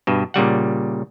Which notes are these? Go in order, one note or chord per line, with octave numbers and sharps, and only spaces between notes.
G2 B2
A#2 C#3 G3 F#5